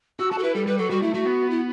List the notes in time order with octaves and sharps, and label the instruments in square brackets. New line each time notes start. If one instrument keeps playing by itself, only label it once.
[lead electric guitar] F#4 [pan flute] E6
[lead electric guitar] F#4 [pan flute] A5
[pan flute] A4
[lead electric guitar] E4 [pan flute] B4
[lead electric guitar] G3 [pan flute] A4
[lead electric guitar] G3 [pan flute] B4
[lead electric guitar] F#3 [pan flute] A4
[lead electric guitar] G3 [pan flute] F#4
[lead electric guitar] A3 [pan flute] E4
[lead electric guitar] A3 [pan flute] F#4
[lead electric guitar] B3
[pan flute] E4